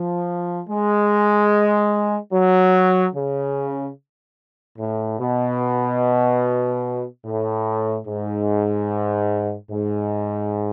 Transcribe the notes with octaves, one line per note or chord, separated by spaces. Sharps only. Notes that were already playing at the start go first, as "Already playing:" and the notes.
Already playing: F3
G#3
F#3
C#3
A2
B2
A2
G#2
G#2